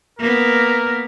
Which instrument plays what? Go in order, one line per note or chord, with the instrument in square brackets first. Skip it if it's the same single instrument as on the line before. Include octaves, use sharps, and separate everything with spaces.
[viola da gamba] A#3 B3 [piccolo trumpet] A#4